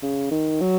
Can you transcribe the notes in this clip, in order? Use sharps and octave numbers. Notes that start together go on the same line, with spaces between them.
C#3
D#3
F#3